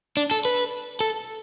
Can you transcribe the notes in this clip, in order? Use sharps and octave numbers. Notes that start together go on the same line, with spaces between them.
D4
A4
B4
A4